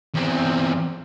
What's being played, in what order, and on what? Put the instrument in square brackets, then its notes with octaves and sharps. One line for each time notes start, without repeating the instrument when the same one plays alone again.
[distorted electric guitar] E2 C4